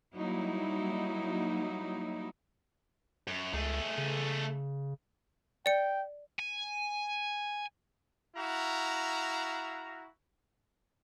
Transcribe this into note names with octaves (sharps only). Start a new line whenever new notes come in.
F#3 G3 A#3 D#4 E4
F#2
C#2 A3 G#4
C#3
D5 G5 C#7
G#5
E4 F#4 F5 A#5